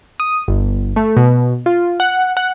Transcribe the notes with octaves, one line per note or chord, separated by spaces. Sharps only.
D#6
G1
A3
B2
F4
F#5
F#5